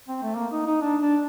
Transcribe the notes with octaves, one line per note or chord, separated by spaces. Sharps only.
C4
A3
A#3
D#4
D#4
D4
D4